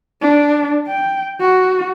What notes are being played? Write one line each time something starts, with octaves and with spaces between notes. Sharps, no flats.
D4
G5
F#4